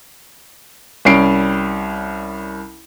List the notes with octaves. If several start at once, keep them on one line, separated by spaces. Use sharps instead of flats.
C2 G3 C#4 C7 D7